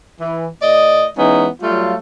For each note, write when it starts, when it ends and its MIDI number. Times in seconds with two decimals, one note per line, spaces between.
0.21 0.47 52
0.62 1.08 45
0.62 1.08 74
0.62 1.08 75
1.18 1.48 52
1.18 1.48 56
1.18 1.48 59
1.18 1.48 61
1.18 1.48 63
1.62 1.95 54
1.62 1.95 55
1.62 1.95 57
1.62 1.95 65